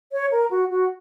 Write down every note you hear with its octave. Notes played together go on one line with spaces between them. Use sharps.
C#5
A#4
F#4
F#4